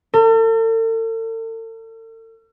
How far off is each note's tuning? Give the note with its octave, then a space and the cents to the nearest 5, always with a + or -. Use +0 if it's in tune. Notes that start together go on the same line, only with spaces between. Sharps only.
A4 +45